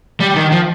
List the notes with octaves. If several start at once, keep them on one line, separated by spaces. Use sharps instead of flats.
G3
D#3
F3